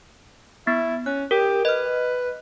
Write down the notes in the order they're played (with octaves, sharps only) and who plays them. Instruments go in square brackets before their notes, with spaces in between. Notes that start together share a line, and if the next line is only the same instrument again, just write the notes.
[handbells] B3 [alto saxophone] E4
[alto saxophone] C#4 [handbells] F#6
[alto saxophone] G4 [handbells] A#4
[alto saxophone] B4 [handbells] D#5 F6